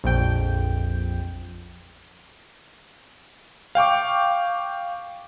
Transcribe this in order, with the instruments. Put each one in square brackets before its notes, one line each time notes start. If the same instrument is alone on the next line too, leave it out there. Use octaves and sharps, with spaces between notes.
[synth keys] A#1 F2 G5
[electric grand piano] F5 G5 C#6 D6